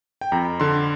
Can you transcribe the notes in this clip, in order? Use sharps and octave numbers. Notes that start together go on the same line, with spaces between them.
G5
F2 A#5
D3 C6